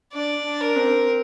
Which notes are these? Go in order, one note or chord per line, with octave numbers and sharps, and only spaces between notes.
D4 D5
D4
A#4
C4